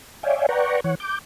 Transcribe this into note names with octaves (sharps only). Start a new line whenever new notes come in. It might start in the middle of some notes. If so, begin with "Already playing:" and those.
C#5 D5 E5 F5 G5 G#5
B4 D5 F#5 G5 A#5 C#6
E3 C#5 F#5
D6 G6